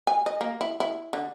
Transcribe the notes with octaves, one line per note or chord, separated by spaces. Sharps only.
G#5
D#5
A#3
E4
E4
D3